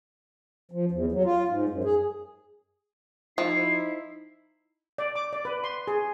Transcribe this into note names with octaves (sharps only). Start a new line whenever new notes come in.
F3
E2
F#3
F4
G#2
F#2
G#4
F3 D#4 E4 C7
D5
D6
D5
B4
C6
G#4